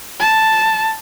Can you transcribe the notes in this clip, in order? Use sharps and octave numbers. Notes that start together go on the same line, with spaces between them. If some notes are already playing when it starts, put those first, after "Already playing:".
A5